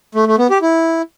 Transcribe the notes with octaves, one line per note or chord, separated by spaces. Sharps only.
A3
A3
B3
G4
E4